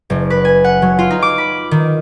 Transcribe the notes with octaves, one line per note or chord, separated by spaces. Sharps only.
F#1
B4
G#5
F#5
F#3
F4
D#4
D6
B5
D#3